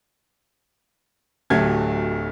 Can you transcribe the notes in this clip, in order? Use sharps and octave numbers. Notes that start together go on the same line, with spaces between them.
D1 D2 F#3 A3 G4 G#6